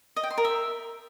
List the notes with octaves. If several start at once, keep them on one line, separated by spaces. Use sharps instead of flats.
D#5
G5
C6
A#4
E5